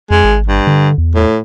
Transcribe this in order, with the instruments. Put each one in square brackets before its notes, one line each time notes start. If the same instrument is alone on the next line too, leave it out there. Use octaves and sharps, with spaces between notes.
[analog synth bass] F2 [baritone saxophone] G#3
[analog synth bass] G#1
[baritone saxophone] G2
[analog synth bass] D3
E2
[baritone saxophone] A2